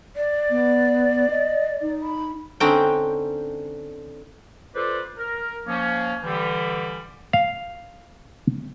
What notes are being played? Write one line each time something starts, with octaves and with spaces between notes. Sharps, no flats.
D5
B3
D#5
D#4
B5
D3 C4 C#4 D#4 G5
F4 A4 B4 C5 D5
A#4
F3 A#3 C#4
D3 E3 G3
F5